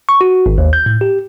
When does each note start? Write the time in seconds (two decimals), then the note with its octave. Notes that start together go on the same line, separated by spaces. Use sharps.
0.09 C#6
0.21 F#4
0.46 G#1
0.58 D#2
0.73 G6
0.86 A2
1.01 G4